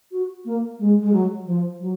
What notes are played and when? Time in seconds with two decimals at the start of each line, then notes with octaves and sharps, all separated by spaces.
0.12 F#4
0.45 A#3
0.79 G#3
1.01 G#3
1.12 F#3
1.46 F3
1.80 F#3